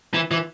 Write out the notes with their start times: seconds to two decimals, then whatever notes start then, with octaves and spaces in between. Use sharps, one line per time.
0.14 E3
0.31 E3